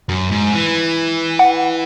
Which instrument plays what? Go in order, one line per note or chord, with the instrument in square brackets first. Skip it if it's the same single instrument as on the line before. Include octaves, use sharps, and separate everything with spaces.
[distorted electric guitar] F#2
G#2
E3
[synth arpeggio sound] F#5